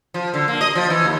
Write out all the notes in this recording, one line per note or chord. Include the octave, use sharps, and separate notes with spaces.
F3
D3
A#3
D#5
F3
E3
D#2